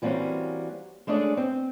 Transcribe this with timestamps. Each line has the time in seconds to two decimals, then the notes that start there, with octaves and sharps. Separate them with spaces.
0.02 E3 G3 A#3 C4 C#4 F#4
1.07 G#3 A3 C#4 D4 G#4 D5
1.37 C4